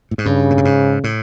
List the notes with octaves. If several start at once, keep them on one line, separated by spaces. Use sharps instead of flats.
A2
G#2
G2 C#3
A#2
A2
G#2
A2